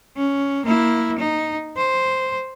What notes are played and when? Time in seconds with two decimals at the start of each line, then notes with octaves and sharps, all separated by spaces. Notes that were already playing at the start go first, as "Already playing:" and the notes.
0.17 C#4
0.66 A#3 E4
1.19 D#4
1.77 C5